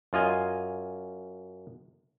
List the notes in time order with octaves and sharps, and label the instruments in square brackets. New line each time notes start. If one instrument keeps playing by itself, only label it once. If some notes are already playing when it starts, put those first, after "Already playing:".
[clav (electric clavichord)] F#2 F4 D#5 G#5